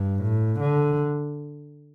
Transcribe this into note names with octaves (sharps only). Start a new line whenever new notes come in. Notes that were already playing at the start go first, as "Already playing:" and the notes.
Already playing: G2
A2
D3